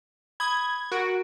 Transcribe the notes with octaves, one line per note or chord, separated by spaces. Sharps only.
B5 D#6 G#6
F#4 A#4 D7